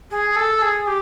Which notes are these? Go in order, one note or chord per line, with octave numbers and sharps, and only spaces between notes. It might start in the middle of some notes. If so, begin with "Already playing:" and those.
G#4
A4
G#4
G4